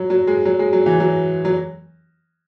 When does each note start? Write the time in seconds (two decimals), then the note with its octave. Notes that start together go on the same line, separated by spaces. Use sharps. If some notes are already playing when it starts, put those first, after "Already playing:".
Already playing: F#3
0.10 F#3
0.28 G#3
0.45 F#3
0.59 G#3
0.73 F#3
0.86 E3
1.00 F#3
1.45 F#3